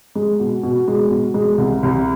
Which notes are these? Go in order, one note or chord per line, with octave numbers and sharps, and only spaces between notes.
G#3
B2
B2
G#3
B2
G#3
C2
C2